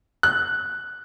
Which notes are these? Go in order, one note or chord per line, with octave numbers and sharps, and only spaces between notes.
F#6